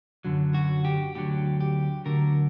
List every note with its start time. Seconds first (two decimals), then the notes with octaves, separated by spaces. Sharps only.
0.25 F#2 D3 F#3
0.54 F#4
0.85 G4
1.15 D2 D3 F#3 G4
1.61 G4
2.05 D2 D3 F#3 A#4